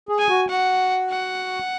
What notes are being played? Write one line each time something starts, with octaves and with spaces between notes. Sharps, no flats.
G#4
G#5
F#4
F#4 F#5
F#5